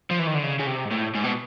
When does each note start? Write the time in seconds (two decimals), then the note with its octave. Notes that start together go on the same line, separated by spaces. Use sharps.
0.11 F3
0.19 E3
0.27 D#3
0.35 D3
0.44 C#3
0.60 C#3
0.67 C3
0.85 G#2
0.91 A2
1.15 G#2
1.24 B2